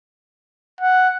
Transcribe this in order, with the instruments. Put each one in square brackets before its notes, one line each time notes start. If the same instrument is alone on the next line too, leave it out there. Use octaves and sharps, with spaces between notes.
[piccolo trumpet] F#5